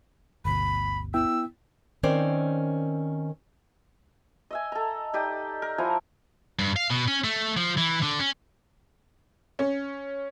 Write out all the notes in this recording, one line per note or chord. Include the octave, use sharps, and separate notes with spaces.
G1 D2 B2 B5
B3 E4 G5 E6
D#3 C4 C#4 A#4 C5 D5
D#5 E5 G#5
A4 A#5
D#4 G4 D5 D#5
A#4
F3 E4 G#5 A#5
G2
F5
B2
C#4
A3
F3
E3
D3
C#4
C#4